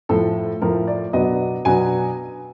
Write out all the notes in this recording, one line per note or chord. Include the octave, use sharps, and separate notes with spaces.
A2 F3 A3 A4
A2 F3 A3 A#4
D5
B2 F#3 B3 D4 D#5
B2 F#3 B3 D4 G#5